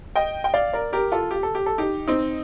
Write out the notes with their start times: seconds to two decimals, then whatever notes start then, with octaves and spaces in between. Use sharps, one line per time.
0.15 D#5 G5
0.44 G5
0.54 D5 F5
0.73 A#4 D5
0.93 G4 A#4
1.12 F4 A4
1.31 G4
1.43 A4
1.55 G4
1.66 A4
1.78 D#4 G4
2.08 C4 D#4